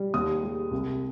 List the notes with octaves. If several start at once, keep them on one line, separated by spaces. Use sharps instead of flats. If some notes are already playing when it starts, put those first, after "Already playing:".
Already playing: G3
D#2 D#6
G#3
C2